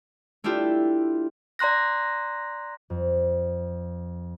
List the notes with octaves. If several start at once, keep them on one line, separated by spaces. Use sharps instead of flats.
A3 D4 E4 F4 G4 A4
D5 A#5 C6 F#6 A#6
F2